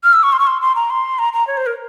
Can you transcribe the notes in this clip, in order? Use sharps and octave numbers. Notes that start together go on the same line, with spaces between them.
F6
E6
C#6
C6
C#6
C6
C6
A#5
C6
A#5
A#5
C#5
C5
A#4